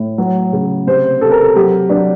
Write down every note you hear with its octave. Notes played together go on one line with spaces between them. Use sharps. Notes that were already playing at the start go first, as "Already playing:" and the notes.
Already playing: A2
F#3
C#3
C3 C5
C3 A4
A#4
A4
F#3 G4
F#3 D4